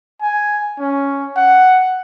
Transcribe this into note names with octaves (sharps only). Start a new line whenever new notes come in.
G#5
C#4
F#5